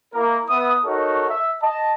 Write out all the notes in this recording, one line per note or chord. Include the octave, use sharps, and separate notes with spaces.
A#3 E4 A#4
B3 E5 D#6
D#4 F#4 A4 A#4 C#5
E5
D#5 A5